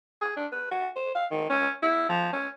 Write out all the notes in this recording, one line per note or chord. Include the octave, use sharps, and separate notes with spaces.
G#4
D4
B4
F#4
C5
F5
D#3
C#4
E4
F3
C#4